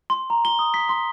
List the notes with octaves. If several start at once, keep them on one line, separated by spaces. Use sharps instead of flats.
C6
A#5
G7
D#6
B6
C6